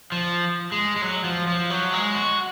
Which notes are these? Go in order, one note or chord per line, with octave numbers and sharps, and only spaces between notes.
F3
G#3
G#3
F#3
F3
F3
F#3
G#3
F#4